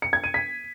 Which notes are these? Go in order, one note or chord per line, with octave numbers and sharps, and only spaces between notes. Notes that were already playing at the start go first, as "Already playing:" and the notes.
C#7
G#6
D#7
B6